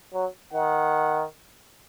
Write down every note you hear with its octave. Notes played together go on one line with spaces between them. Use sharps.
F#3
D#3 F#5